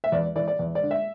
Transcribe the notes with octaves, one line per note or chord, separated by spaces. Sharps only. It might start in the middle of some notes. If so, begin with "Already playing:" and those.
E5
E2 D5
E3 D5
D5
E2
D5
D3
E5